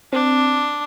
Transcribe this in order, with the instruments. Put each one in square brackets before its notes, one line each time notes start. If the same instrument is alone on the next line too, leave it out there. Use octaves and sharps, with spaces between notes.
[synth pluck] C4 [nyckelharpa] D4